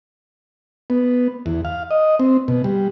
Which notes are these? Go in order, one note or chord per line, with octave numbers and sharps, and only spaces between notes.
B3
E2
F5
D#5
C4
B2
G3